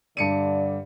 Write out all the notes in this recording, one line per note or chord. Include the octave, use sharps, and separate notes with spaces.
G2 D3 D5 C#7 D#7